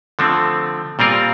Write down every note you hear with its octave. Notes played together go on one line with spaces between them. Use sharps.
D3 F3 A3 C4
A#2 G3 C4 F4 A#4